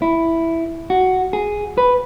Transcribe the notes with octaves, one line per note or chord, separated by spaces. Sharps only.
E4
F#4
G#4
B4